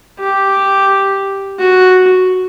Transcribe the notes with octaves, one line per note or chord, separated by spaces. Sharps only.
G4
F#4